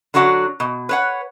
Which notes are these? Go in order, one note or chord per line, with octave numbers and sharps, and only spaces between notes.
D3 F#3 D4 F#4 F#5
B2
B4 C#5 F#5